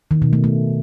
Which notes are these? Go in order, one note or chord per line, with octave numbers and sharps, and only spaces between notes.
D#3
B2
A3
A3